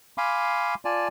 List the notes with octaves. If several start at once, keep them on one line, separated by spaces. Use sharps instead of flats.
F5 G#5 B5 C6 D6
F4 D5 G#5 A5